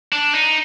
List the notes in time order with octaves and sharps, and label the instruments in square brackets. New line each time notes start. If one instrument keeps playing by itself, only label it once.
[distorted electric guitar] D4
D#4